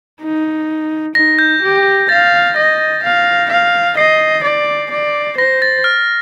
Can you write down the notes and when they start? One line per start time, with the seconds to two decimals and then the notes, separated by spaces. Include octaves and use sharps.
0.21 D#4
1.15 D#4 A#6
1.39 G6
1.62 G4
2.09 F5 A6
2.56 D#5 A#6
3.03 F5
3.50 F5
3.97 D#5 C7
4.43 D5
4.91 D5
5.37 C5 A#6
5.62 A6
5.84 F6